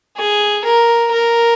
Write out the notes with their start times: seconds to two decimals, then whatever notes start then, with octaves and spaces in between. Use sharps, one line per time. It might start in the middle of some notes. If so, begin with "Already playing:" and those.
0.17 G#4
0.65 A#4
1.12 A#4